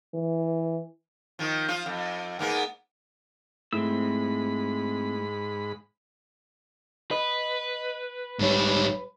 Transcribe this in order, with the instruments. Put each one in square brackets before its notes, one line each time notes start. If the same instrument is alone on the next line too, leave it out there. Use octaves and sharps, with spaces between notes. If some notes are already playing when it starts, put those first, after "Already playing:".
[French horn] E3
[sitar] D#3 F3
F3 F4
F2
G#2 A#3 B3
[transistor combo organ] G#2 B5 [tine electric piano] A3 E4 [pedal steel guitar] C4 E6
[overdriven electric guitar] B4 [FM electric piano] D#5
[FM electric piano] B1 C#5 [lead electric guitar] G#2 G3